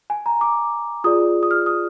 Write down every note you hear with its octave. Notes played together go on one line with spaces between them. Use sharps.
G#5
A#5
D6
F4 G#4 D5 D#6
D#6
F6
D#6